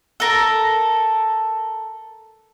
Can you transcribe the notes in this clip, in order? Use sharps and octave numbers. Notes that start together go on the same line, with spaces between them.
A4 A#4